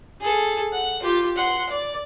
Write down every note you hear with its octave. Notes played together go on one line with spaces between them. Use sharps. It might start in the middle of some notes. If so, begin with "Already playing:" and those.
G#4 A4
F#5
F4 G4
F#5 C6
D5